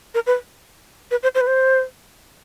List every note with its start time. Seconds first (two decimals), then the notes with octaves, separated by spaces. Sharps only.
0.15 A#4
0.27 B4
1.11 B4
1.23 C5
1.35 C5
1.41 B4
1.47 C5